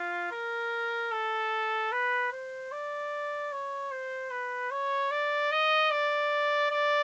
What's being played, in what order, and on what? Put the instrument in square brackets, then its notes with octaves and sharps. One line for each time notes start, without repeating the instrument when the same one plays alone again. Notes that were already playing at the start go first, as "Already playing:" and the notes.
Already playing: [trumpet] F4
A#4
A4
B4
C5
D5
C#5
C5
B4
C#5
D5
D#5
D5
D5